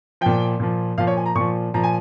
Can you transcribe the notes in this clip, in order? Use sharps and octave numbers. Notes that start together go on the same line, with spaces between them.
A#2 F3 G5
A#2 F3
A#2 F3 F5
C#5
G#5
A#5
A#2 F3 C#6
A#2 F3 A#5
G#5